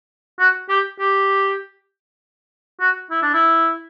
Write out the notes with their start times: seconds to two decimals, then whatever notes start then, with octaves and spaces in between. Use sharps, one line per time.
0.39 F#4
0.69 G4
0.99 G4
2.80 F#4
3.11 E4
3.22 D4
3.34 E4